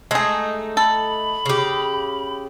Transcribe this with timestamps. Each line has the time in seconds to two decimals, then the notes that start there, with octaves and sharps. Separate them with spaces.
0.11 G#3 A3 D#4 G#4
0.77 A4 B5
1.46 C#3 G4